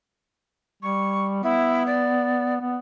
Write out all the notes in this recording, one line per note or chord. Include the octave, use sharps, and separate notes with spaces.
G3 C#6
B3 E4
D5
B3